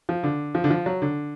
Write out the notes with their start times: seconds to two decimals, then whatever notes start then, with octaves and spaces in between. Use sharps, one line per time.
0.09 F3
0.23 D3
0.55 F3
0.64 D3
0.70 F3
0.86 F#3
1.02 D3